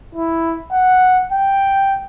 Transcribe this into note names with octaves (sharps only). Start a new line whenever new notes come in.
E4
F#5
G5